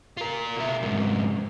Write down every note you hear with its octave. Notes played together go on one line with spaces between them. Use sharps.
F4 A#4
B2 E5
F2 G#2